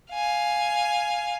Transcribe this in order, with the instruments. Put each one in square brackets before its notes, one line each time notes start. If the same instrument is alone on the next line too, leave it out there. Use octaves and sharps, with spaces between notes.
[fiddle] F5 G#5